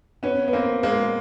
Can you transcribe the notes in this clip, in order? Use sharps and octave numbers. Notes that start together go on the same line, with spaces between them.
B3 C#4
B3
A#3 C4
G#3 A#3